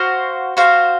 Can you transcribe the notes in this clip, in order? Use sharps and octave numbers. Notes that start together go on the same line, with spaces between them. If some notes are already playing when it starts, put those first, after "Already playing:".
Already playing: F#4 C5 F5
F#4 C5 F5